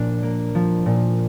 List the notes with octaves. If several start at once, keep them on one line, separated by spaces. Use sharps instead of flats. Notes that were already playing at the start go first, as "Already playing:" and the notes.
Already playing: A#2 F3 D4
A#3
F3
A#2